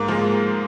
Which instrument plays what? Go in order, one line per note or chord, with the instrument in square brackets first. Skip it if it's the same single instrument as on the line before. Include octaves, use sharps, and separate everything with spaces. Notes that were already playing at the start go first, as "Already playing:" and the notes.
Already playing: [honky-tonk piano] G#2 [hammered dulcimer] A#3
[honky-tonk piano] F3 G#3